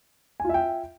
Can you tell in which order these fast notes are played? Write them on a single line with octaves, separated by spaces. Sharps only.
G#5 F4 E5 G5